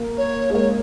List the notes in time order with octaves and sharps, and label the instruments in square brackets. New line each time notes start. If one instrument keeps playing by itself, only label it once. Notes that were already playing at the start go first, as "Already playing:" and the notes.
Already playing: [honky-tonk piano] A#3
[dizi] C#5
[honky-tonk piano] G#3
[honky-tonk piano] A#3 [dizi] C#5